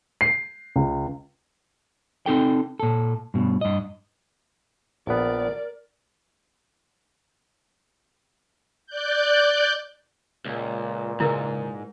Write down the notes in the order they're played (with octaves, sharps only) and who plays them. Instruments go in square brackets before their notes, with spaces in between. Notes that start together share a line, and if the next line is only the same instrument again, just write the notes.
[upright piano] C7
C#2
[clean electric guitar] C4 D#4 A4 G5
A#2 A4
G2 B2
G2 D#5
[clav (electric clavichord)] A#1 B3 [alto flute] A#4 [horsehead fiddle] D5
[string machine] D5 F#6 G6
[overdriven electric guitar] C#2 [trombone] A#2
[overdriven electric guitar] G#2 [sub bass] C#3 [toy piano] E4 A#4 B4